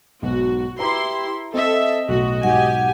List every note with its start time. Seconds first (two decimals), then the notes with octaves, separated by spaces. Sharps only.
0.22 B1 G#2 B2 F#4
0.79 E4 G4 B4 A#5 C6
1.54 C4 A4 D#5 E5
2.08 B1 A2 F#4
2.43 B1 G#2 G4 F#5 G#5